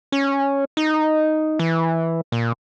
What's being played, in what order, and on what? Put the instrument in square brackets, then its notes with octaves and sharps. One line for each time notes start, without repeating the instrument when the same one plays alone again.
[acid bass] C#4
D#4
E3
A#2